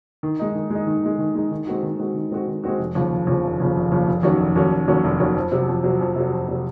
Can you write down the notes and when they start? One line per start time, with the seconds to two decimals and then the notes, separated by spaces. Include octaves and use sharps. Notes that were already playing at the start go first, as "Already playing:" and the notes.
0.23 D#3
0.40 G#3 D#4
0.55 D#3
0.70 G#3 D#4
0.87 D#3
1.03 G#3 D#4
1.19 D#3
1.35 G#3 D#4
1.51 D#3
1.67 G#3 C4 F#4
1.83 D#3
1.99 G#3 C4 F#4
2.15 D#3
2.32 G#3 C4 F#4
2.48 D#3
2.64 G#3 C4 F#4
2.79 F1
2.95 D#2 C#3 F3
3.12 F1
3.27 D#2 C#3 F3
3.44 F1
3.60 D#2 C#3 F3
3.76 F1
3.92 D#2 C#3 F3
4.07 F1
4.23 D#2 D#3 F#3 C#4
4.41 F1
4.56 D#2 D#3 F#3 C#4
4.72 F1
4.88 D#2 D#3 F#3 C#4
5.04 F1
5.20 D#2 D#3 F#3 C#4
5.36 F2
5.52 C3 F#3
5.68 F2
5.84 C3 F#3
6.01 F2
6.16 C3 F#3
6.33 F2
6.49 C3 F#3